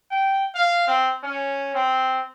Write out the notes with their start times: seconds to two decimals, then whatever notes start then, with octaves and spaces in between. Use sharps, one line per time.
0.10 G5
0.54 F5
0.87 C4
1.23 C#4
1.74 C4